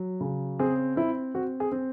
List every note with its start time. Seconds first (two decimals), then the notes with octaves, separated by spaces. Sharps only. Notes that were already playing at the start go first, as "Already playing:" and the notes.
Already playing: F#3
0.20 C#3
0.59 C4 G#4
0.96 C4 E4
1.35 C4 F#4
1.60 G#4
1.72 C4